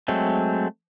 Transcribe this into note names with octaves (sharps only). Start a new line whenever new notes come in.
F#3 G#3 A3 C4